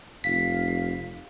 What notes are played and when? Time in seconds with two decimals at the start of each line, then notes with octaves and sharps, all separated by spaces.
0.24 F1 F5 B6